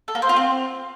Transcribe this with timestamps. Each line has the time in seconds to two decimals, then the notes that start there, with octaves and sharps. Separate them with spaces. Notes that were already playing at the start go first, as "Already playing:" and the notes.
0.08 A4
0.15 A#3
0.22 C5
0.29 F4
0.36 C4